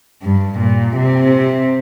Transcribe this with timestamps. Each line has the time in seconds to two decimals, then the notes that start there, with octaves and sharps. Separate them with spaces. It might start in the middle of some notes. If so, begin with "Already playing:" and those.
0.23 G2
0.60 A#2
0.97 C3